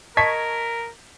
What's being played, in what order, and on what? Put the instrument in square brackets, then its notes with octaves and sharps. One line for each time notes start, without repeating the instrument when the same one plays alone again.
[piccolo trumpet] A#4 [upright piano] D#5 B6 [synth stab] A5 C#6 G#6